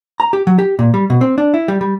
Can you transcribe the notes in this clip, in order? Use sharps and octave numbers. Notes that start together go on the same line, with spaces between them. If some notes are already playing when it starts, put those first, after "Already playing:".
A#5
G4
F#3
G4
A#2
G3
B2
C4
D4
E4
G3
G3